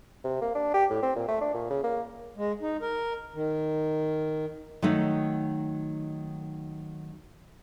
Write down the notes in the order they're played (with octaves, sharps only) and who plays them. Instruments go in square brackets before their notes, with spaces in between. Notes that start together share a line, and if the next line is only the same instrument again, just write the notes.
[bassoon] C3
A#3
D4
G4
A2
C4
A#2
A3
D4
A#2
C#3
A#3
[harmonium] G#3
D#4
A#4
D#3
[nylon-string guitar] D#3 F#3 A3 D#4